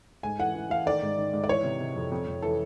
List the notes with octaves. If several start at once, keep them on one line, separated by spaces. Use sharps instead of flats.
G#2 G#5
E3 F#5
E3
E3 F5
D#3 D5
G#2
D#3
G#2
D5
E3 C#5
C3
C3
F2
F2
F2
E3 A4